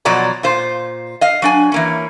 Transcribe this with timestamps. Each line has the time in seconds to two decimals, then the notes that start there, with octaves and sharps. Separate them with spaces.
0.05 B2 F3 F#3 D5 A#5
0.43 A#2 F4 C5
1.21 D#5 F5
1.42 F#3 D4 G#5
1.72 E3 A#3 C#4